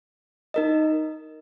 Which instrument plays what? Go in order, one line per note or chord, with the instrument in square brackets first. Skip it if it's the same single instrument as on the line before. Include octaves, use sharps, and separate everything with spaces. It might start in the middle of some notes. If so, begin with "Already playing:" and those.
[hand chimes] D#4 A#4 D#5